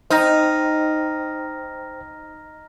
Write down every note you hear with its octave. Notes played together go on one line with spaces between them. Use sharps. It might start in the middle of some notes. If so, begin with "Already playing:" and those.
D#4 C5 G5 A#5 F6 A#6